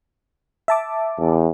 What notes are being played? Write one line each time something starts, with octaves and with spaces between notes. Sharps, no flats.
E5 A5 D6
E2